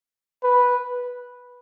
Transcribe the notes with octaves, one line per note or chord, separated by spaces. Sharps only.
B4